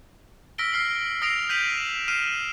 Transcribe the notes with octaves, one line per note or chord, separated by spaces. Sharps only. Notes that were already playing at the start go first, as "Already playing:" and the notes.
E6 F6 A#6 B6 D7 G7
F6 C7 F#7
D#6 E6 A#6 C7 D7 F7
F#6 G6 B6 D#7 F7 F#7
E7
F6 C7 D#7 E7